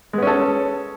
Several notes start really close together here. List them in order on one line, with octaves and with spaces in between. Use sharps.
G#3 B3 C#4 A4